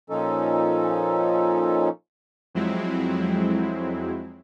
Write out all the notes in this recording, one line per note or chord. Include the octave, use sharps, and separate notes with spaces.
A#2 F3 C#4 D#4 A4
F2 F#3 G#3 C4 E4